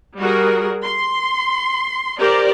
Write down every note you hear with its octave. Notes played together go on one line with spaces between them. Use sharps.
G3 F#4 G#4 A#4
C6
G4 A#4 C5 D5